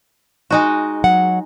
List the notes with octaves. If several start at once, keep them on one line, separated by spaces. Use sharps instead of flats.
G#3 D#4 F#4
F#3 F#5